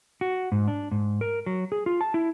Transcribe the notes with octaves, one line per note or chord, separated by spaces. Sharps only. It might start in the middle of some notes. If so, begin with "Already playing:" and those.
F#4
G#2
D4
G#2
A#4
F#3
G#4
F4
A5
E4